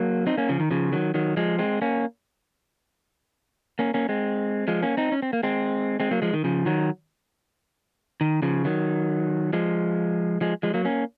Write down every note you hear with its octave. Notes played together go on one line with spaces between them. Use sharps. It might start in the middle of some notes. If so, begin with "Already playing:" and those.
Already playing: F#3 A#3
C4 D#4
A#3 C#4
C#3 F3
D#3
C#3 F3
D#3 F#3
D#3 F#3
F3 G#3
G#3 C4
A#3 C#4
A#3 C#4
A#3 C#4
G#3 C4
F3 G#3
A#3 C#4
C4 D#4
C#4
C4
A#3
G#3 C4
G#3 C4
F#3 A#3
F3 G#3
D#3
C#3 F3
D#3 F#3
D#3
C#3 F3
D#3 F#3
F3 G#3
F3 G#3
F3 G#3
F#3 A#3
A#3 C#4